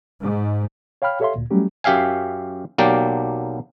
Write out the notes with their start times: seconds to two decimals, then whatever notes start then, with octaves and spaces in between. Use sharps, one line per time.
0.21 G#2
1.02 C#5 F5 G5 B5 F6
1.20 G4 A4 C#5 E5 F5 C6
1.36 D2 A#2
1.50 F#3 G3 A3 C#4 G4
1.84 F#2 G4 E5 F5 G#5
2.78 B1 F#3 A#3 G4 D5